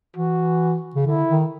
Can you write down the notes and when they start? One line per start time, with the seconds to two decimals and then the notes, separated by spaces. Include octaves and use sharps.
0.16 E3 F#4
0.96 C#3
1.06 D3 E4
1.29 D#3